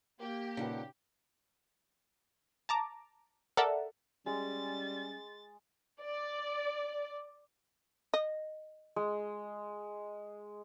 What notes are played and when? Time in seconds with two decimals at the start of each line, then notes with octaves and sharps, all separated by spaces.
0.20 A#3 G4
0.57 A#2 C#3 D#4 B4 F#5 A5
2.69 A5 A#5 D6
3.57 A4 A#4 D5 E5 F#5 A5
4.26 G3 G#3 C#4 A6
6.01 D5
8.14 D#5
8.96 G#3